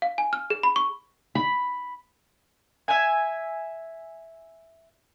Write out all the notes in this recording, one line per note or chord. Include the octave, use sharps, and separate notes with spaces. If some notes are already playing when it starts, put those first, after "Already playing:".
F5
G#5
F6
G#4
B5
C#6
B5
E5 G#5